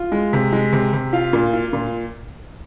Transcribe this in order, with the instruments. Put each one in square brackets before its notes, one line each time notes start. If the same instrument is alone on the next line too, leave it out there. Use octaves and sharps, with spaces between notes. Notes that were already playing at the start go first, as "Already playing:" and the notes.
Already playing: [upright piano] F4
G#3
C3
G#3
C3
C3
F4 F5
A#2
F4
A#2